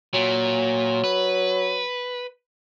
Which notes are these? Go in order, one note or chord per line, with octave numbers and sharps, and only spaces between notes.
A#2 F#3
B4